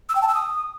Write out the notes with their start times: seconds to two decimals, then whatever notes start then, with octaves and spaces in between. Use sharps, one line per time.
0.09 E6
0.16 G5
0.22 A5
0.28 E6
0.35 D#6